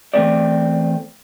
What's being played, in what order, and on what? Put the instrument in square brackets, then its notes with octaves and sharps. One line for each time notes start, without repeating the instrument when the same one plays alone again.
[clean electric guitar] E2 A#2 A3 C4 D5